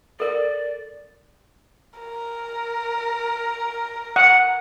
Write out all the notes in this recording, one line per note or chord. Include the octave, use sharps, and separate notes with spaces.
A4 A#4 D5
A#4
F#5